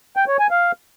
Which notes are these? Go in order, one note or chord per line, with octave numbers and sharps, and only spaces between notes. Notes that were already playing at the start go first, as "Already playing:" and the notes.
G5
C#5
G#5
F5